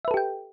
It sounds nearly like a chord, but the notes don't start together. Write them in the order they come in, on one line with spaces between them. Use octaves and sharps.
E5 B4 A4 G4 G5